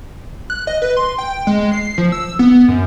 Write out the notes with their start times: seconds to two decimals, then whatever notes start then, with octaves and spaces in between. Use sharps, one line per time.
0.50 F#6
0.67 D#5
0.82 B4
0.97 C6
1.18 G5
1.47 G#3
1.72 C7
1.98 F3
2.12 E6
2.39 B3
2.68 F#2